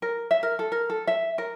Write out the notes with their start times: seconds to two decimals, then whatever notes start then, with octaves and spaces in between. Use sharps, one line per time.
0.02 A#4
0.31 E5
0.43 A#4
0.59 A4
0.72 A#4
0.90 A4
1.07 E5
1.38 A#4